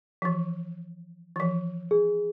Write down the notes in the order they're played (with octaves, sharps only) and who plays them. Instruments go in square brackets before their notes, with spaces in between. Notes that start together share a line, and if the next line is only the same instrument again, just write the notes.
[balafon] E3 F3
E3 F3
[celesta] G#4